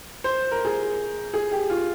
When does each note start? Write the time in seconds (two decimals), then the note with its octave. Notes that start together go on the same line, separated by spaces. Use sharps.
0.24 C5
0.51 A#4
0.65 G#4
1.34 G#4
1.52 G4
1.70 F4